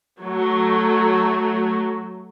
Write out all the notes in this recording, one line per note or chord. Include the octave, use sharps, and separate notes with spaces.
F#3 A3